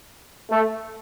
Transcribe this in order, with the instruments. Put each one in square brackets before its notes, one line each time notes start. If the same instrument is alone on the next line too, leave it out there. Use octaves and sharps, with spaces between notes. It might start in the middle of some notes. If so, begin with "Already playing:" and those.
[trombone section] A3